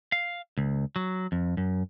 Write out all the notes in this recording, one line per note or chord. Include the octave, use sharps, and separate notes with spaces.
F5
C#2
F#3
F2
F#2